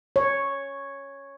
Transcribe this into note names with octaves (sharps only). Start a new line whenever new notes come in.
C#5